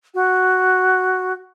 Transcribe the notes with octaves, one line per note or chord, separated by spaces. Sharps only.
F#4